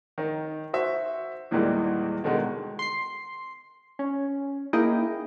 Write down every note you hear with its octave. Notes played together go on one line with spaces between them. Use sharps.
D#3 D#4
F#4 C5 E5
E2 A#2 D#3 E3 G3 G#3
B2 D3 D#3 G#3
C6 C7
C#4
A#3 D#4 E4 G#4 D#5 G5